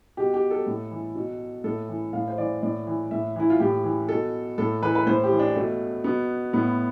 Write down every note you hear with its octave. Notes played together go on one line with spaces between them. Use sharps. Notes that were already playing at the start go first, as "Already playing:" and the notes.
B2 G4
G4
A4
A2
E3
B2
A2 A4
E3
A2 F5
C5
E3 D5
A2 D5
E3
A2 E5
E3 E4
F4
A2 G4
E3
B2 A4
A2 A4
E3 B4
B4
A2 C5
G4
E3
D4
B2 A3
B2 B3
A2 B3